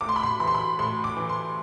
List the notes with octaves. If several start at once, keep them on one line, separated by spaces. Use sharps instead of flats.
A2 D6
C6
B5
C6
E3 B5
C6
B5
A2 C6
D6
E3
C6